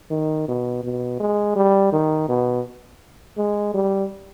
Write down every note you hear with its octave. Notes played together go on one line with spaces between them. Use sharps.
D#3
B2
B2
G#3
G3
D#3
B2
G#3
G3